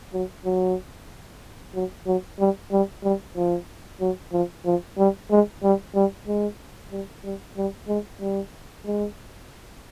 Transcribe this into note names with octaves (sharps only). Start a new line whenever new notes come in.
F#3
F#3
F#3
F#3
G3
G3
G3
F3
F#3
F3
F3
G3
G#3
G3
G3
G#3
G3
G3
G3
G#3
G3
G#3